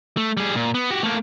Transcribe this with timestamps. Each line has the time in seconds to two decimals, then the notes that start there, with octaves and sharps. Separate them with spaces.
0.17 A3
0.37 G3 G#4
0.56 A#2
0.74 B3
0.91 F#4 G4
1.03 A3 A#3